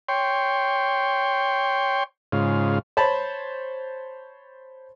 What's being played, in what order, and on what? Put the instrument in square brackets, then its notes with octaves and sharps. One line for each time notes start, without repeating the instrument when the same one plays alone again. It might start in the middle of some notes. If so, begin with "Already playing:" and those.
[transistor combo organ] C#5 G5 C6
G#2 C#3 F4
[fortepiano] C5 C#5 A5 B5